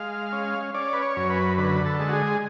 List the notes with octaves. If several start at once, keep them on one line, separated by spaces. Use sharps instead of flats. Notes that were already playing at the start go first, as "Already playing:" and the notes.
Already playing: G#3 F5
C#4
C#4 D5
B4
C#5
F#2
B4
D3 B4
A4
G#3
F#4
G#4